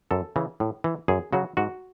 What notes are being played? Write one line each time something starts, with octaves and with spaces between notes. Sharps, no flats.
F#2 A4
C#3 E3
A2
E3
F#2 G#4
C#3 F#3 F#4
G#2 F#4